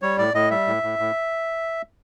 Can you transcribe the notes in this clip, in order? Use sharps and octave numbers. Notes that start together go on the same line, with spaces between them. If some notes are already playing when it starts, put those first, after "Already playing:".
G3 C#5
A2 D5
A2 D#5
G3 E5
A2
A2
A2